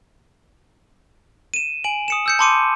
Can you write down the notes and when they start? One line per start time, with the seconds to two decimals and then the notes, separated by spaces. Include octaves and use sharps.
1.54 D#7 E7
1.84 G#5 D7 F#7
2.08 D#6 C#7 E7
2.26 E6 G6 C#7
2.39 A5 B5 C6 D6 C#7 D#7